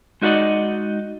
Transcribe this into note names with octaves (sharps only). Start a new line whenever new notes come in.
G#3 D#4 F#4 A#4 D5 D#5